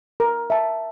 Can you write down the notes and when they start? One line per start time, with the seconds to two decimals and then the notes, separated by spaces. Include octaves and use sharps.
0.20 A#4
0.50 E5 A5